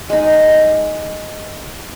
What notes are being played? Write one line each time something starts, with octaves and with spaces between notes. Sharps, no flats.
G#3 D#4